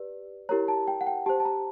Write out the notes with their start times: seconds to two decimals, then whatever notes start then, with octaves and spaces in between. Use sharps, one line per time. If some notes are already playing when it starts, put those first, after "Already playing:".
Already playing: G4 B4 D5
0.49 E4 G4 A#4 C#5 A#5
0.68 A5
0.88 G5
1.01 F#5
1.07 G5
1.26 G4 C5 A5
1.40 A5
1.45 A#5